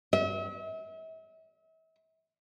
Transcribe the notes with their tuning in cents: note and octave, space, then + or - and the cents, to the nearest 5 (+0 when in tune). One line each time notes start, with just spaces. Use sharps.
E5 -40